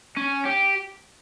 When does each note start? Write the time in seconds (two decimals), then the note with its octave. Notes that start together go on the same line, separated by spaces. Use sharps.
0.17 C#4
0.45 G4